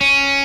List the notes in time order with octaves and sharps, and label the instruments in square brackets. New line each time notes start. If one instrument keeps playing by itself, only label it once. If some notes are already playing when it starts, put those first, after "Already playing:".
[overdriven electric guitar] C#4